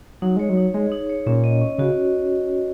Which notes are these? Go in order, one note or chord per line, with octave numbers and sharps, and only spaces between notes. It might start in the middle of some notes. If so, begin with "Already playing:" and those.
F#3 D#4
G#3 C#5
F#3
D#4
G#3 G#4
D#4
C#5
A#2 C#4
D#5
C#4
C#3 F#4